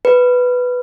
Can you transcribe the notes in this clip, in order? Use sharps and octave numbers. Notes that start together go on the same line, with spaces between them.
B4